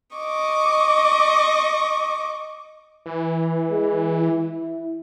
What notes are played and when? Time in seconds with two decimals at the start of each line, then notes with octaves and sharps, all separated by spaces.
0.16 D#5 C#6 D6
3.06 E3
3.71 G#3
4.21 E4